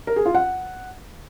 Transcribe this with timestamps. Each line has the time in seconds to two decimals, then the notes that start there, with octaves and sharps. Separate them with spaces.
0.07 A#4
0.16 G#4
0.25 F4
0.35 F#5